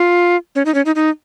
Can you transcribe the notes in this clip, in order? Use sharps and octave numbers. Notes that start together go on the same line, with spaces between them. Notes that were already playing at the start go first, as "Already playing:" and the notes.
Already playing: F4
C#4
D#4
C#4
D#4
D#4